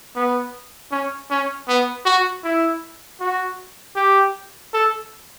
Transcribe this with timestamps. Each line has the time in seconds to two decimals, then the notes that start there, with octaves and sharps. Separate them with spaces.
0.16 B3
0.92 C#4
1.30 C#4
1.68 B3
2.06 F#4
2.44 E4
3.20 F#4
3.96 G4
4.73 A4